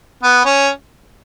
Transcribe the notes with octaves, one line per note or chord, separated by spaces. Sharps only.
B3
C#4